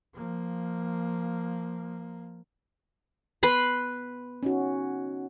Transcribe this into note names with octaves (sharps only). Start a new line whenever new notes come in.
F3 A#3
B3 B4 B5 C6
C#4 D#4 F#4